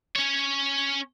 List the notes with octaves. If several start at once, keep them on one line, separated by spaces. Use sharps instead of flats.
C#4 C#5